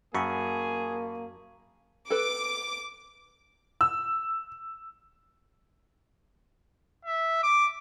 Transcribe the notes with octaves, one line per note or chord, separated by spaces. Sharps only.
F#2 A#3 G#4 A5 B5 C#6
A4 B4 D6
E6
E5
D6